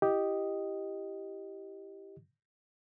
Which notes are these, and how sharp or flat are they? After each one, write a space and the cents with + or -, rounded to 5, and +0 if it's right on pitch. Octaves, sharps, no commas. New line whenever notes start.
E4 +15 G4 +0 D#5 +0